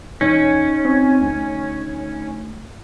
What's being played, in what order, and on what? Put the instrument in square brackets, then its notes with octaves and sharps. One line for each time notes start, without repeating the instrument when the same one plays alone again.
[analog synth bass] E1 [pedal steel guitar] C#4 [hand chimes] D#4 C#5
[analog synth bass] C4
D2